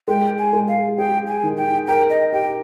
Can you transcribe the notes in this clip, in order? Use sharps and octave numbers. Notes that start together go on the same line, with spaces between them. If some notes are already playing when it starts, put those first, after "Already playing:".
G#3 G5
G#5
G#3
F5
G#4 G5
G#5
D#3
G5
A#4 G5
D#5
G4 G5